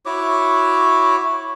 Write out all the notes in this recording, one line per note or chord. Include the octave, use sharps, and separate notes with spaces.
E4 F#4 C#5 D6